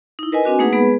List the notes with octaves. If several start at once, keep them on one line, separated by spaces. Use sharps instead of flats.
D#4 E4
A#4 B4 D#5 G#5
C4 D4 F#4 G#5
A3 A#3 D#4 G#4 B4 F#5
G#3 B3 G#4 B4 B5